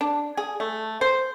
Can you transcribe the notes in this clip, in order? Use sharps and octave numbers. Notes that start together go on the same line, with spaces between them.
D4
G#4
A3
C5